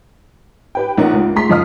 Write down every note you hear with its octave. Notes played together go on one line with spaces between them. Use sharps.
G4 B4 G5
A#1 C#4 D#4 A#4 F#5
C#2 F4
A3 G#4 A#5 C6 B6
F#1 F3 D#5 F5 D#6 F6